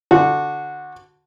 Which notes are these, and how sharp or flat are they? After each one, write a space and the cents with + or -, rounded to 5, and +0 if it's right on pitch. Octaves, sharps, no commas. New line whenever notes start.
D3 +0 F#4 -15